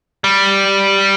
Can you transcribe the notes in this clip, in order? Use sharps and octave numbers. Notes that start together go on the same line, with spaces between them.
G3